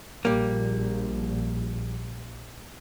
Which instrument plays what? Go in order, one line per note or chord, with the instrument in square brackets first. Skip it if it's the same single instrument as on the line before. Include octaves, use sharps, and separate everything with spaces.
[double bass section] A#1 [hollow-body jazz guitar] G3 A#3